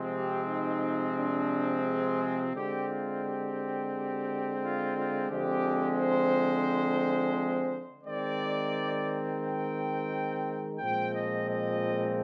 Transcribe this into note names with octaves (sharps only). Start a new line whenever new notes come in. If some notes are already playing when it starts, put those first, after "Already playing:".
Already playing: C3 F3 G#3 C4
G4
D#4
D4
G#4
D3 G#3 C4 G4
F4
G4
G4
F4
F4
D3 F3 G#3 C4 G4
C5
D#3 G#3 C4 D5
G5
A#2 F3 G#3 C4 G5
D#5
D#5